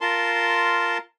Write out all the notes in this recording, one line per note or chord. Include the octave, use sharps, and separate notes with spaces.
F4 A#4 A5 C6